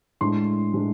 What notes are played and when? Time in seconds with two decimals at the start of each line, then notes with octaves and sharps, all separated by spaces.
0.21 A2 G#3 D4 C6
0.74 A2 G#3 D4